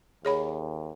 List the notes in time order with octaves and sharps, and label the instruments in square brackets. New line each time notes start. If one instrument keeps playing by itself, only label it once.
[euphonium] D#2 [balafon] G#4 C#5 B5